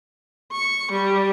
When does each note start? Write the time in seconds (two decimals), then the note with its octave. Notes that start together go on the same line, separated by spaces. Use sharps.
0.52 C#6
0.92 G3